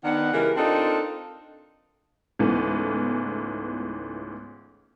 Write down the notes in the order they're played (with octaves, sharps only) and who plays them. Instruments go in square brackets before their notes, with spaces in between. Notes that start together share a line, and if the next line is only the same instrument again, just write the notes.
[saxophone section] D#3 B3 D4 F#5
C#3 E3 G#3 G4 A#4
C4 D4 D#4 F4 A4 A#4
[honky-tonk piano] C#2 G#2 E3 A3 B3